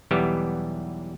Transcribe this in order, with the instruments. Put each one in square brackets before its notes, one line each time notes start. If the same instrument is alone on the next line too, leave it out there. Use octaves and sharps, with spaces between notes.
[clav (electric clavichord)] B1 E2 E3 G3 B3 G4